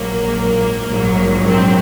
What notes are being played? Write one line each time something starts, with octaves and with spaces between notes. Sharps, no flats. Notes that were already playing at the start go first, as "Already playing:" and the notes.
Already playing: A#1 G#2 F#3 A#3
A#1 G#2 F#3
C4